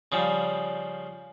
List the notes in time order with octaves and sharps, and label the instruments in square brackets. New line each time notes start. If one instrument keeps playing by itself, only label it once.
[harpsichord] C#3 F3 G3